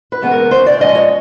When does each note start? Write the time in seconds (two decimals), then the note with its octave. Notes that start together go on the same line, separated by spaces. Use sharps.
0.12 B4
0.22 C#3 E3 G#3 B3
0.32 A#4
0.51 C#3 C5
0.66 D5
0.81 F3 G#3 C#4 D#5
0.95 C#5